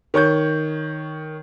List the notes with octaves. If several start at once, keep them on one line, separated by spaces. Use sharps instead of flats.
D#3 C#5 C#6 G6